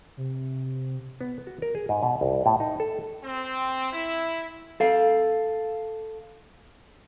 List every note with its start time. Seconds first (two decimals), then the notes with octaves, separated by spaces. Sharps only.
0.17 C3
1.21 B3
1.47 F#4
1.62 A#4
1.75 G#4
1.89 G#2
2.03 B2
2.21 C2
2.46 A2
2.60 D#4
2.80 A4
3.24 C4
3.93 E4
4.80 A4 F5